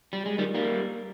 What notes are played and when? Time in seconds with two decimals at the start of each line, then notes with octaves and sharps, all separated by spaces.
0.13 G3
0.26 G#3
0.38 D#3 G3
0.55 G3 A#3